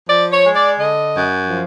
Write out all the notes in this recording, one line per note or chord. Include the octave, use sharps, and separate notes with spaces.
F3 D5
C#5
G#3
D5
D3 D#5
F#2
F3